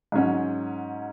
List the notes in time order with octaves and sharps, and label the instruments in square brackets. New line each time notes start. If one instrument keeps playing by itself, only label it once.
[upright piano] G#2 F#3 C#4